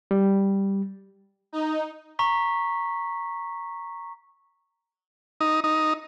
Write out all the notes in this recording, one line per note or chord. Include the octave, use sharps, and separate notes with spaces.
G3
D#4
A#5 C#6 B6
D#4
D#4